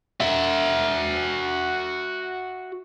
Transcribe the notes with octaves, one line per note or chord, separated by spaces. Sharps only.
F#4 E5